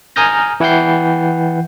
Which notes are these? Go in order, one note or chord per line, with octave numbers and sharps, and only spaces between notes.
G#5 A#5 D#6 F6 G6 A#6
E3 E4 F#5 G5 G6 C7